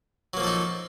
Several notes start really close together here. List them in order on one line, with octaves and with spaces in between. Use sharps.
F#3 A#3 F3 A4 D#4